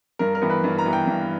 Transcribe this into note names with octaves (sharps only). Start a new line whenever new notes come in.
G2 A#4
A#4
E3 B3
B4
G2
A#5
E3 B3
G5
G2